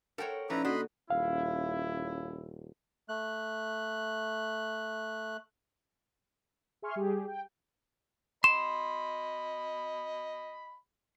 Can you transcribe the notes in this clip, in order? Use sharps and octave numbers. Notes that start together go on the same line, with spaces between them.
A4 A#4 C5 C#5 F#5 G5
A#2 F3 C#4 D#4 E4 B4 D5 A#5
D3 A#3 F#4 D#5 B5 C6
D#1 C#4 E4 F5
A3 F#6
G#4 E5 G#5 C6 C#6 F6
G3 G4 G#4
G5
D#5 B5 C6 E7